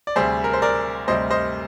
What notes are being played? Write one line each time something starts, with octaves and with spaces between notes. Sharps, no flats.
D5
D2 C3 G3 G#4 C5
A#4
C5
A#4 D5
D2 C3 G3 C5 D#5
C5 D#5